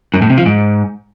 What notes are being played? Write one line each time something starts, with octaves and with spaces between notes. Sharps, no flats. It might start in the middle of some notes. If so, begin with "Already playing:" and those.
F#2
A2
C3
F3
G#2